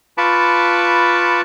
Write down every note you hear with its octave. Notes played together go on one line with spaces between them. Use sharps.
F4 B4 A5 B5 C#6 D6